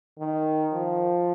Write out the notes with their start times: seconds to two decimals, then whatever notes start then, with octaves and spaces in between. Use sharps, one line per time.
0.18 D#3
0.73 F3